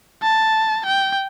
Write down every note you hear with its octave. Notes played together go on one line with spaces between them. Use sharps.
A5
G5